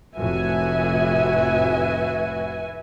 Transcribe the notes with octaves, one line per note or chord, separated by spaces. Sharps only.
F1 A2 F#4 B4 E5 G#5